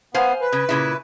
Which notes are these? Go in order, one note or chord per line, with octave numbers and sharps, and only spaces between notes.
B3 C5 F5 G#5
B4
C#3
A#2 C#3 E4